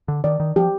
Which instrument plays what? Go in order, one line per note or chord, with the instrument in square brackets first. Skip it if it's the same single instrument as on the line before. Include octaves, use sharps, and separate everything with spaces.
[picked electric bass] D3
[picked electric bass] D#3 [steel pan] D5
[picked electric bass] D#3
[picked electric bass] F3 [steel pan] G4